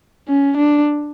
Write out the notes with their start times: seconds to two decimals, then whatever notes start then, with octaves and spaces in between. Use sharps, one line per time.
0.29 C#4
0.57 D4